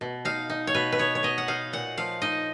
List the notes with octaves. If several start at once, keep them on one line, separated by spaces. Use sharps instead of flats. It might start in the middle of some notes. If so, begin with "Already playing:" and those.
B2
D#4 F5
D#4
C#5
B2 B4
B4
B3 C#5
C#5
B3 D#5
F#5
D#4 F5
A#2 F#5
F3 F5
D#4 D#5